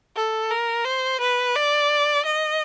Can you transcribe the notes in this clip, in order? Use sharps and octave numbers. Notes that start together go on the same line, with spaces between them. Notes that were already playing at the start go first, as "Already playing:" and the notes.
A4
A#4
C5
B4
D5
D#5